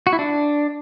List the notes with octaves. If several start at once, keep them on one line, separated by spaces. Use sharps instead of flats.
F#4
E4
D4